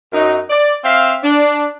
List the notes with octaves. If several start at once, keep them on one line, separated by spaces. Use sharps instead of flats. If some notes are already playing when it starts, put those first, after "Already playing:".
F#2 D#4
D5
C4 E5 F5
D4